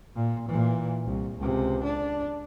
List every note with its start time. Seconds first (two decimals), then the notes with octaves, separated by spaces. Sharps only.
0.16 A#2
0.48 A#2 E3
1.05 C2
1.38 C#2 C3
1.84 D4